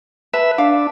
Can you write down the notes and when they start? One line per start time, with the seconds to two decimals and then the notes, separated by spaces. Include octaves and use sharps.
0.34 B4 E5 A5
0.58 D4 F5